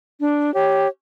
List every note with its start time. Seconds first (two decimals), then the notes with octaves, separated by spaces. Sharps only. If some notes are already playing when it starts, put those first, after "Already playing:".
0.20 D4
0.54 G4 C#5